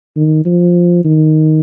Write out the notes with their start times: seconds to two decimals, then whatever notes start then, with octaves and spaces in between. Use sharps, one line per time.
0.16 D#3
0.45 F3
1.04 D#3